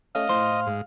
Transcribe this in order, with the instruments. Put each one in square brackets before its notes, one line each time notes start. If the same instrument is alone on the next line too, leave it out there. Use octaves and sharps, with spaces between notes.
[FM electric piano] A3 C#4 [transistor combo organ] D#5 [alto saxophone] F5
[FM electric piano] A2 [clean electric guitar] C5
[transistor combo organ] G#2